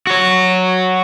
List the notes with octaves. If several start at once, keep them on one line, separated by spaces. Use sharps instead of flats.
F#4 C#5